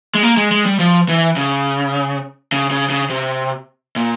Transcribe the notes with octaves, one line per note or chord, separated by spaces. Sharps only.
G#3
A#3
G#3
G#3
G3
F3
E3
C#3
C#3
C#3
C#3
C3
A#2